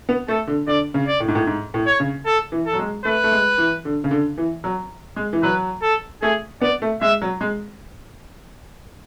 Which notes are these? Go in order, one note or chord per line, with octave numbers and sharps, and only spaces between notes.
B3
A3 A4
D3
D3 D5
C#3
D5
A2
G#2
A2
G#2
A2
C#5
C#3
A4
E3
A4
F#3
G#3
A3 B4
A3
G#3
E3
D3
C#3
D3
E3
F#3
G#3
E3
F#3 B4
A4
A3 G#4
B3 D5
A3
G#3 E5
F#3
G#3